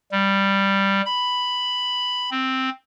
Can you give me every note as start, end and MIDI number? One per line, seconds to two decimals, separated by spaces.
0.12 1.01 55
1.05 2.30 83
2.31 2.70 60